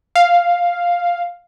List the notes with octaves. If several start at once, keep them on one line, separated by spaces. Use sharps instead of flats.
F5